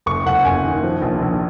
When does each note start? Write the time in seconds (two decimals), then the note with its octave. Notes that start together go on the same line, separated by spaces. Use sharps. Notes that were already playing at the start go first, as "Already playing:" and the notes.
0.06 F#1 C#6
0.25 F#1 F#5
0.45 F#1 G#5
0.65 D#3
0.83 F3
1.02 A#1
1.22 A#1